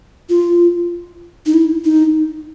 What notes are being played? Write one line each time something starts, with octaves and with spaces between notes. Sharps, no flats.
F4
D#4
E4
D#4